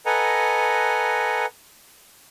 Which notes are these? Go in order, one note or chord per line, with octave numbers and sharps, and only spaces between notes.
A4 B4 D#5 F#5 G#5 A#5